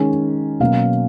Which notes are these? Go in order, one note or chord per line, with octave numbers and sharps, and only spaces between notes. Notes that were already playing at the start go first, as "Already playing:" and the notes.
Already playing: D#3 G#3 C#4
B2 F#3 A#3 C#4 F5